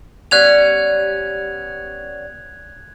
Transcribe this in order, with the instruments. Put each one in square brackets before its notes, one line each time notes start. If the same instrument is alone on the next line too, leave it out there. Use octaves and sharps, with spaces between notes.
[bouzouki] G3 B3 C#4 [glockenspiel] F#6 G#6 F7